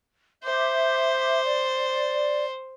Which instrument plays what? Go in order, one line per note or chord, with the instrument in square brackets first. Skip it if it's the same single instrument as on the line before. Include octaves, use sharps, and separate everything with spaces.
[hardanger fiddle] C5 [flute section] E5 D6 G6
[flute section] D5